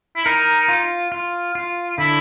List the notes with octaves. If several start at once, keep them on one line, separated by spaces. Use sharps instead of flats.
E4
D#4 A#4
F4
F4
F4
D3 E4